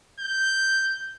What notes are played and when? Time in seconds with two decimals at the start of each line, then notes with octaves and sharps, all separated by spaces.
0.20 G6